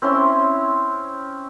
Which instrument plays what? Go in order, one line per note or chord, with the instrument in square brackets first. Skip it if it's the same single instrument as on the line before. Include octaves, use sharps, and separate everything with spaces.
[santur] C4 C#4 E4 C6